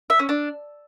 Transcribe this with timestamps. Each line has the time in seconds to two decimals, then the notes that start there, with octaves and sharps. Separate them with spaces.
0.10 E5
0.19 C#4
0.29 D4